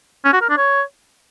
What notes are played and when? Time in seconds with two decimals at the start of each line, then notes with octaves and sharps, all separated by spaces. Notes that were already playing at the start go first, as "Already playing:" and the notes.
0.25 C#4
0.33 F#4
0.41 A#4
0.49 D4
0.57 C#5